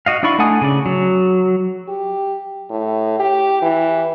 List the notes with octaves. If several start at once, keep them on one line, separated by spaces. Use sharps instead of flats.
F#4 D#5 F5
D4 E4 D5 B5 C#6
A3 D4 F#5 G#5 D#6
C#3 D5
F#3
G4
A2
G4
E3